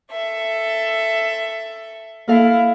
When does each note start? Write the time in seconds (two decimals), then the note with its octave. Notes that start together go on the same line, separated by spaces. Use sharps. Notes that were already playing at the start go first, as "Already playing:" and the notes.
0.12 A4 E5
2.28 A#3 E4 A4 F5